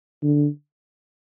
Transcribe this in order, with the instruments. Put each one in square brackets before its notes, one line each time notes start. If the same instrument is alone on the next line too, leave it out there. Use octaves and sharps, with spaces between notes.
[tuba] D3